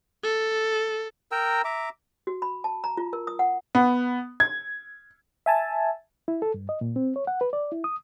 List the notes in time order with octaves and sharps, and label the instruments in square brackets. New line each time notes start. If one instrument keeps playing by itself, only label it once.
[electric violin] A4
[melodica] A#4 G5 A#5 E6
E5 A#5 D6
[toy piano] F#4
B5
A5
A#5
F4
A#4
D#6
F#5
[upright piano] B3
G#6
[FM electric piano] E5 G#5 A5
[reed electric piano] E4
A4
G2
D#5
A#2
C4
C#5
F#5
B4
D5
E4
D#6